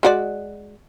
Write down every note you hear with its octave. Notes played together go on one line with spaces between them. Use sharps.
G#3 F#4 D5